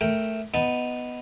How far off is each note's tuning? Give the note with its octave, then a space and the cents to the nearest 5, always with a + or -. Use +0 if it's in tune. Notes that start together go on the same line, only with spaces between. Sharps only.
A3 -5 A#4 +0 G5 +0
B3 +0 D#4 +0 A5 +0